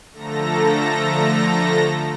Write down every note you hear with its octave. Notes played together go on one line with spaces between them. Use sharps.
D3 F3 A3 A4 A#5 A#6